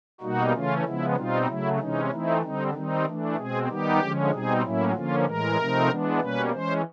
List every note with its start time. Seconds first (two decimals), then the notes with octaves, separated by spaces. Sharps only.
0.21 B2 G3 A#3 D#4 F#4
0.52 C#3 E3 A3 C#4 F4
0.83 C#3 F3 G#3 B3 E4
1.16 B2 G3 C4 D#4 F4
1.47 C#3 F#3 A3 E4
1.79 C3 E3 G#3 C#4 D#4
2.11 E3 A3 C4 D#4 E4
2.41 D3 G3 C4 D#4
2.73 D#3 G3 C4 D#4
3.04 E3 A3 D4
3.36 B2 G#3 C4 G#4
3.68 D#3 G3 B3 D#4 G4
3.99 D3 F3 G#3 C#4
4.31 B2 G3 C4 D#4 G#4
4.62 A2 F#3 A#3 C#4 E4
4.94 D3 F3 A#3 C#4 F4
5.25 A2 E3 G#3 A#4
5.58 C3 F3 A3 C4 D#4
5.88 E3 G#3 B3 D4
6.20 B2 G3 A#3 C#4 B4
6.51 E3 G#3 C#4 C5